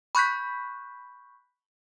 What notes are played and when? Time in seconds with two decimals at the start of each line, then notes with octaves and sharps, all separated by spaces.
0.15 B5 C#6 F#6 G6 B6